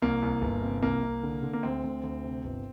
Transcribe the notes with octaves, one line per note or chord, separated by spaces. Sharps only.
C2 A#3
C2
G1
C3
C2 A#3
C2
D3
D3
A#3
D2 C4
D2
D2
C3
G1